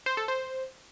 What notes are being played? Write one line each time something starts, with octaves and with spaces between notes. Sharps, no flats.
C5
A4
C5